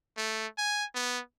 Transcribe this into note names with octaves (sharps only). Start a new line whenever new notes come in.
A3
G#5
B3